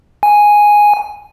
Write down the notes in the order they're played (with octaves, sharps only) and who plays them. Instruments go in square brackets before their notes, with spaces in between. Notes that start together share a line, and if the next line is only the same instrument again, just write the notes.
[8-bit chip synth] G#5